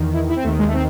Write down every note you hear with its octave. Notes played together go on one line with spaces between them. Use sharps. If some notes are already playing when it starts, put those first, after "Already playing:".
Already playing: E2 D#3
E4
E4
C4
D#2 D#3 A3
G#3
A3
C4